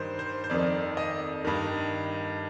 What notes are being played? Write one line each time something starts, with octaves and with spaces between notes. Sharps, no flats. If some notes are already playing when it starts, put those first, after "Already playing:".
Already playing: G2 D#3 C5
C5
C5
F2 D#3 D5
D#5
G2 D#3